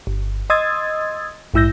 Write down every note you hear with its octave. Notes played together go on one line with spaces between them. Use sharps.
G1
D#5 C6 D#6 E6 G#6 A6
A#1 G#2 E4 E6 G6 A#6